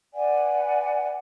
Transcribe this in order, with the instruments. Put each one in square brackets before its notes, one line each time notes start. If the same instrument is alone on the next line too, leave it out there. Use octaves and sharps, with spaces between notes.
[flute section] B4 D5 F#5 G#5